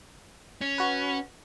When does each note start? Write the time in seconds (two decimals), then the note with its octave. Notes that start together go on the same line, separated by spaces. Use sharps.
0.61 C#4
0.78 F#4 B4